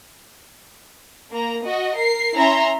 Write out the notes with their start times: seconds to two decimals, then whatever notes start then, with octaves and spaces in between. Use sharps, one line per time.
1.32 A#3 A#5
1.65 F#4 D#5
1.95 A#4 C7
2.35 C#4 E4 E5 A#5 C6